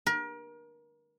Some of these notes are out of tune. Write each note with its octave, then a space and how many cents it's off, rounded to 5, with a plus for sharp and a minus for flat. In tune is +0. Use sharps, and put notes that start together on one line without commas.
A#4 +35